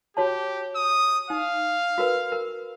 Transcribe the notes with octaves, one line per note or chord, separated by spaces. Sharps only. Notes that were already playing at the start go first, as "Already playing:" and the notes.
F#4 G4 C#5 A5
D#6
D#4 F5
F#4 A#4 B4
A#4